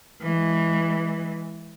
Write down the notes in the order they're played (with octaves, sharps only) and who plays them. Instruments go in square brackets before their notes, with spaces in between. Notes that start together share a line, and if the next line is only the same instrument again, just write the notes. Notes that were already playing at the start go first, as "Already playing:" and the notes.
[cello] E3 G#3